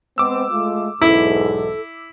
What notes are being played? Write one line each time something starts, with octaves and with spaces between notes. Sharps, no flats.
G#3 B3 C4 D6 E6
G#3 A3 F4
B1 E2 G#2 E4 A4